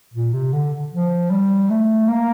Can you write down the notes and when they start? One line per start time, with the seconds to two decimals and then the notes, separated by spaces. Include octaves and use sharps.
0.14 A#2
0.33 C3
0.53 D3
0.92 F3
1.31 G3
1.70 A3
2.08 A#3